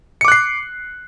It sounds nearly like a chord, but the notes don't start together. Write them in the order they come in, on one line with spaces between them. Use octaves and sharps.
C#7 D6 F#6 C7